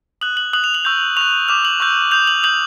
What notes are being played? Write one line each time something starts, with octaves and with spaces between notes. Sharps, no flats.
D#6 F#6 F#7
F#7
D#6 F#6 F#7
F7
F#7
C#6 E6 G6
C#6 F#6 F7
D6 F6 F7
F#7
C#6 E6 G6
D#6 G6 F7
F#7
D#6 G6 F#7